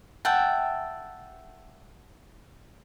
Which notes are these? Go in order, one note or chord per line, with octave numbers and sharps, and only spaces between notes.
E5 F#5 G5 A5